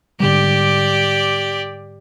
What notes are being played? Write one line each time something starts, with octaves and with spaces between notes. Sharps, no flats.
G#2 D3 G3 G4 D5